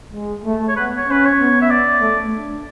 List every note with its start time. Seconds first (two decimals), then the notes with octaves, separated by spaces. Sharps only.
0.14 G#3
0.45 A3
0.69 C#5
0.76 B3 B4
0.97 C#5
1.08 C#4 B4
1.25 C#5
1.39 B3
1.62 E5
1.71 D5
2.02 A3
2.34 D4